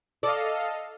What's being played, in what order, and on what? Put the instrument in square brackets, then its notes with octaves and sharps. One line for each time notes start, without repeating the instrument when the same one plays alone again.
[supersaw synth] A4 D#5 F5 [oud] D5